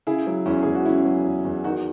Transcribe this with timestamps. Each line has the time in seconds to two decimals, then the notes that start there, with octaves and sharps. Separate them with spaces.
0.07 C#3 E4 G#4
0.27 F#3
0.46 E2 C#4 E4
0.63 E2 G#4
0.75 F#4
0.85 C#3 C#4 E4
1.05 F#3
1.25 E2
1.45 E2
1.64 D#3 D#4 F#4